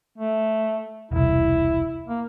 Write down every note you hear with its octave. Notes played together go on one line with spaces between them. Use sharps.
A3
E1 C2 E4
A#3